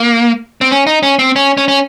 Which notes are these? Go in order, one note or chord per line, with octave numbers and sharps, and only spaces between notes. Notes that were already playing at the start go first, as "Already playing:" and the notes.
Already playing: A#3
C4
C#4
D#4
C#4
C4
C#4
C#4
C#4